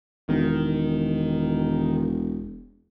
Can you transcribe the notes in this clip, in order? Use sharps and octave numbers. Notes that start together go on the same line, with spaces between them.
E1 D#3